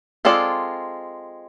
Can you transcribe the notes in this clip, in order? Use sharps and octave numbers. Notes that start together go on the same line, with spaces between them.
G#3 C4 F4 A4 D5